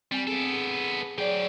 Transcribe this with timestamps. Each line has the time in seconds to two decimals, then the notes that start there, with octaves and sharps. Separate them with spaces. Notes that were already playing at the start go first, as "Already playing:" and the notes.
0.12 G3 C4 G#5
0.27 B3 G#4 A4 D7
0.53 G#4
1.18 F#3 G#4 C5 D5 G5